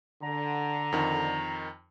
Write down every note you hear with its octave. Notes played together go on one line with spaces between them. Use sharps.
D3 A#5
F2 D#3